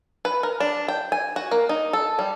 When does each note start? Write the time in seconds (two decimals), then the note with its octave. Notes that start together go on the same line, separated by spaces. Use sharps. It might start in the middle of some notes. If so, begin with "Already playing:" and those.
0.25 B4
0.43 A#4
0.60 D4
0.88 G5
1.12 G#5
1.36 F#4
1.51 A#3
1.69 D#4
1.93 A4
2.19 G3